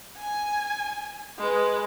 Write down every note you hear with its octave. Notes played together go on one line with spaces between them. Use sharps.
G#5
G#3 B4